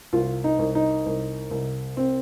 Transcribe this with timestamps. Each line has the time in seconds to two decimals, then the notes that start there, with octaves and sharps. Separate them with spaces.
0.13 C2 F4
0.44 D#4
0.59 C2
0.75 D#4
1.06 C2
1.51 C2
1.97 C4